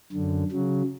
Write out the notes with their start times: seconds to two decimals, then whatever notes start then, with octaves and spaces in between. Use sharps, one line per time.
0.12 F#2 D3
0.52 C#3 F#3